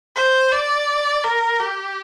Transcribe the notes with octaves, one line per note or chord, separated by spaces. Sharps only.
C5
D5
A#4
G4